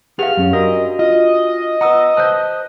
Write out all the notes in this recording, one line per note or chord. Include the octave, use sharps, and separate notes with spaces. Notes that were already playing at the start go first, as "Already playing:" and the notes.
G4 G#4 B4 F5 F#5 F6
F#2 C#4
D4 F#4 A#4 D#5
F4 D#5
B4 F#5 A#5 D#6 E6
B4 C5 A5 F#6 G6